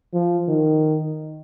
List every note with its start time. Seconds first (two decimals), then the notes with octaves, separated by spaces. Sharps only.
0.14 F3
0.48 D#3